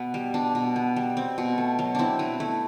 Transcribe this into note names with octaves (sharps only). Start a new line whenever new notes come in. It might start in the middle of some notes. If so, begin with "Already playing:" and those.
Already playing: B2 B3
G3
B2 D4
B2
B3
G3
C4
B2
A3
F#3
C4 D4 E4
B2 E4
A3 E4